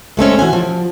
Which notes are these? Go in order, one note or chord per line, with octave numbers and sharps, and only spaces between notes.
G#3 A3 C4 C#4
E3 F#4 G#5
F3